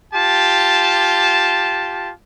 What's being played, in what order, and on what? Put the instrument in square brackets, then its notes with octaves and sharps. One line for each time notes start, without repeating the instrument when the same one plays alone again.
[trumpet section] F4 G4 A5